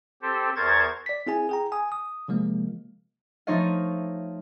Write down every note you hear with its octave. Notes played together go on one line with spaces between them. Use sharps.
C4 G4 A4 C5
E2 A#4 C5 C#6 G#6 A6
D5 B6
C4 E4 G#4 G#5
G#4 G5 A#5
G#5 D#6
D#6
C3 F3 G#3 A#3
F3 A3 D#4 C#5 D#5 F5